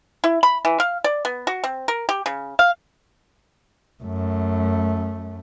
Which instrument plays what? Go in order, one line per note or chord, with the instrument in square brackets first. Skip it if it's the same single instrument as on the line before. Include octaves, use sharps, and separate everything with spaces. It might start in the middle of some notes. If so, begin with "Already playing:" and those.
[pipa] E4
B5
E3
F5
D5
B3
F#4
C4
A#4
G4
C#3
F5
[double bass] F#2 A3